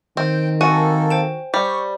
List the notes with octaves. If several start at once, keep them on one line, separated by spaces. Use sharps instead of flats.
D#3 C4 G5
A#3 C4 F#4 A4 G#5
C5 G5 E7
G3 C5 C#6